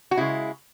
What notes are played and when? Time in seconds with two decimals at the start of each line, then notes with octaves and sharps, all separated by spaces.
0.11 F#4
0.17 C#3 G#3 E4